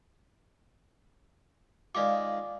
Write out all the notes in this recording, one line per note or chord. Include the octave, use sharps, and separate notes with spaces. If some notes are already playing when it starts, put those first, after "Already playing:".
D#3 G#3 F4 D5 F5 D6